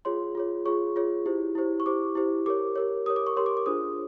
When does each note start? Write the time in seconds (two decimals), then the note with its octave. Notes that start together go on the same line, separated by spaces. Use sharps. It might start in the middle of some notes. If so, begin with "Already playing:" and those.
0.05 F4 G#4 C#5 C6
0.35 F4 G#4 C#5
0.66 F4 G#4 C#5 C#6
0.96 F4 G#4 C#5
1.26 E4 G4 C5
1.55 E4 G4 C5
1.80 C#6
1.86 E4 G4 C5 D6
2.15 E4 G4 C5
2.46 G4 A#4 C#5 D6
2.76 G4 A#4 C#5
3.06 G4 A#4 C#5 D#6
3.16 D6
3.27 C#6
3.37 G4 A#4 C#5 C6
3.46 D6
3.57 D6
3.66 D4 F4 G#4 C5 D#6